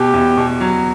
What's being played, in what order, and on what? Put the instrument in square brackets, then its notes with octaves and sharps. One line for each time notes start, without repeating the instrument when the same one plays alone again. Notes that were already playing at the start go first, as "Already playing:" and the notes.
Already playing: [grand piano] B2 [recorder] G4
[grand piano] E2
B2
F#3